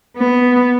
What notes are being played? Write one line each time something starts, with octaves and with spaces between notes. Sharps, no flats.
B3